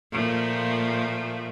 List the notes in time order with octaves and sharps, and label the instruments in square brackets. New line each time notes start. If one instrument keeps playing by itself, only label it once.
[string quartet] A#2 F3 A3